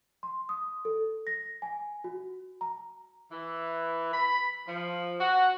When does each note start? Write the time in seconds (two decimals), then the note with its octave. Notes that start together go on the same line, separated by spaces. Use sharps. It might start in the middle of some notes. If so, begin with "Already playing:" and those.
0.23 C6
0.49 D#6
0.85 A4
1.27 A#6
1.62 G#5
2.04 F#4
2.61 A#5
3.32 E3
4.13 B5
4.68 F3
5.20 F#4